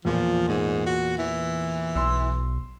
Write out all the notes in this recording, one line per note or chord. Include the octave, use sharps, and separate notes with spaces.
E2 A#2 F3
G#2
F#4
E3
B1 C6 E6